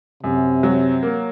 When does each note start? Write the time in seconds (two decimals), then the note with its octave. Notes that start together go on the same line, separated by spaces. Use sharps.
0.23 F#2 C3
0.63 F#3
1.03 A#3